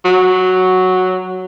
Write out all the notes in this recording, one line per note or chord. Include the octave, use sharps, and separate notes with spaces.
F#3